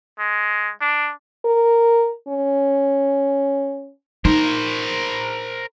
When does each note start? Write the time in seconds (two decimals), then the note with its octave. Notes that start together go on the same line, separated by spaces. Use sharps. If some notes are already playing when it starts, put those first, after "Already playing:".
0.19 G#3
0.81 D4
1.45 A#4
2.28 C#4
4.25 D#4 A#4 C5